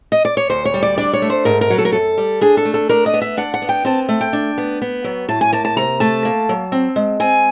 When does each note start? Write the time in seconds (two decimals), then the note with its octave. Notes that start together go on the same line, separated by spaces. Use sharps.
0.12 D#5
0.25 D5
0.37 C#5
0.49 D2 C5
0.65 C#5
0.74 G3
0.83 D5
0.98 D4 D5
1.13 C#5
1.22 A3
1.30 C5
1.45 G#2 A#4
1.61 A#4
1.70 F#3
1.78 A4
1.85 A#4
1.92 F#2 A4
2.18 G3
2.41 D4 G#4
2.57 A4
2.65 A3
2.74 A4
2.89 D4 A#4
3.06 D#5
3.14 B3
3.22 E5
3.37 D4 F#5
3.54 F#5
3.62 B3
3.69 G5
3.85 C4 A5
4.09 A3
4.21 G5
4.33 D4
4.58 B3
4.82 B3
5.04 F#3
5.28 A2 A5
5.41 G#5
5.52 A#3 A5
5.65 A5
5.77 C3 A#5
6.00 A3 A5
6.25 A#3
6.49 F#3
6.72 C4
6.96 G#3
7.20 C4 G#5